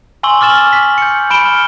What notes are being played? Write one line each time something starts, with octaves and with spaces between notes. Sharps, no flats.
G#5 C6 C#6 E6 F#7 G7
D6 F6 A6 E7 F#7
B6
G6 C#7
B5 D7 E7 G7
F6